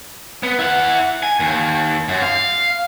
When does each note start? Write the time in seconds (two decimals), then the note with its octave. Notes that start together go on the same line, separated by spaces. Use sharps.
0.43 B3
0.59 E4 F#5
1.23 G#5
1.40 D#2
2.08 F#2
2.22 F5